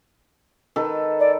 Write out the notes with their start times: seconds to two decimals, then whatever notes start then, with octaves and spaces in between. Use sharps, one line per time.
0.76 D#3 A4 B4
1.20 D5